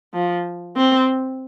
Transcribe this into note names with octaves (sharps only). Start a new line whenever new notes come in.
F3
C4